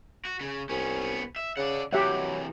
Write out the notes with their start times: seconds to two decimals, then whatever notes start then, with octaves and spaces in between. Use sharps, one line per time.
0.25 F#4
0.41 C#3
0.69 C2 B3 C#4
1.36 E5
1.57 C#3 D5 F#5
1.93 C3 E3 F#3 G4 E5 F#5